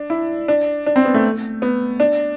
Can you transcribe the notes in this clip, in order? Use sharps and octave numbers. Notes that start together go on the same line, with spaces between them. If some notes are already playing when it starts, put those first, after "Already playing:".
Already playing: D4
E4
D4
D4
C4
B3
A3
B3
D4